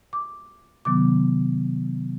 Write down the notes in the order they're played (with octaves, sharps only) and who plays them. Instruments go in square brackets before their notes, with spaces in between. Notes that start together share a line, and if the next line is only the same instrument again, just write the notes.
[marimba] D6
C3 D#3 F#3 B3 D6